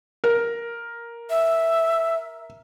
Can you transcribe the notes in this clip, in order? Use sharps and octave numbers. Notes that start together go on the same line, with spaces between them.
A#4
E5